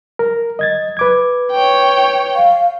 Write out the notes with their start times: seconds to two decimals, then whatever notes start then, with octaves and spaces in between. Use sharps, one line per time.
0.19 A#4
0.59 D#5 G#6 A6
0.97 B4 D6 G#6
1.52 C#5 G5
2.35 F5